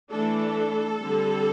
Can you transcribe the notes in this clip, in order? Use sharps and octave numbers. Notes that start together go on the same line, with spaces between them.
E3 A3 D4 A4
D3 G3 C4